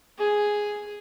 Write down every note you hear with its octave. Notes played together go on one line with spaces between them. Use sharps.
G#4